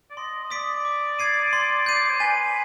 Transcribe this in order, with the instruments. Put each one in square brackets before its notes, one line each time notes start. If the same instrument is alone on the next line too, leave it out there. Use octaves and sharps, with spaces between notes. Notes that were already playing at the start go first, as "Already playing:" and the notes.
[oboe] D5
[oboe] D#5 [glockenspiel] C6
[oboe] D#5
[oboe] D5 [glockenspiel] D#6 B6 D7
[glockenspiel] D6
G#6 C7 D#7
C6
G6 C7 D#7
[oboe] D5
C5
[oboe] B4 [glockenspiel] G#5